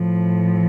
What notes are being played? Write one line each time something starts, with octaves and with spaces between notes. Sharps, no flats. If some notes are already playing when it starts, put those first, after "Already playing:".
Already playing: A2 F3